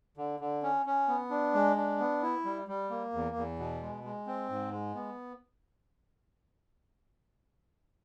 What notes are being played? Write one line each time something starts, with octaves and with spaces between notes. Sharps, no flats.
D3
D3
C#4
C#4
B3
D4
G#3
D4
B3
E4
G3
G3
A#3
E2
E2
B2
G#3
G#3
C4
G#2
G#3
B3